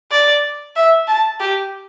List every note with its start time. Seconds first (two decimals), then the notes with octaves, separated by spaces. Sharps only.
0.11 D5
0.76 E5
1.07 A5
1.40 G4